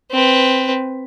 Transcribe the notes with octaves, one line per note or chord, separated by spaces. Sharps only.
C4 B4